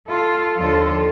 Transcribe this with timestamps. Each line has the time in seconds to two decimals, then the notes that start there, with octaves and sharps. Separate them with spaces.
0.10 F4 A4
0.58 D#2 D3 F3 F4 A4